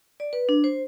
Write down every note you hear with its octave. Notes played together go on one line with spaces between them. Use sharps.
D5
B4
D4
C5